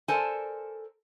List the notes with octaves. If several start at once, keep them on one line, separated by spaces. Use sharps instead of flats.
A4 A#4 C5 D5 G#5 A5